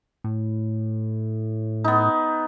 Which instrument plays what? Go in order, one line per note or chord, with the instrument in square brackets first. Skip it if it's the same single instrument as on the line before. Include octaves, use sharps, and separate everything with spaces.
[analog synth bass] A2
[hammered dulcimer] B3 D#4